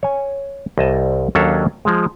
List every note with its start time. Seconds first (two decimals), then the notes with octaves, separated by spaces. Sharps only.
0.03 C#5 G#5
0.78 C2 D#5 A5
1.35 D#2 F#3 C#4 D4 A4 F5
1.85 F3 G#3